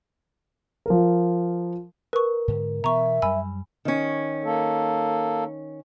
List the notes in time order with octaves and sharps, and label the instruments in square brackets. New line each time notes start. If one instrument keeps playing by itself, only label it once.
[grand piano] F3 A#4
[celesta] A#4 [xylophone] B4 C#6
[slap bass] G#2 D3
[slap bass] B2 E3 B3 [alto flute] E5 [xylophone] A#5 C#6
[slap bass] F#2 G3 [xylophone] G#5 B5 E6
[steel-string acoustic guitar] D#3 C#4
[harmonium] A#3 A4